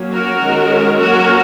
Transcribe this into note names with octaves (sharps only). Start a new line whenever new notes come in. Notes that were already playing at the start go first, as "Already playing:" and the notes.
Already playing: F#3 A#3 C#4
F#4 A#4
D#3 G#3 C#4
F#3 A#3 C#4 F#4 A#4